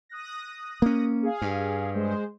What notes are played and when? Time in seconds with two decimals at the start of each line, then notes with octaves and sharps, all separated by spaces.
0.09 D#6 F#6 A#6
0.82 A#3 C#4
1.23 G#4 F5
1.42 G2
1.94 G#3 C5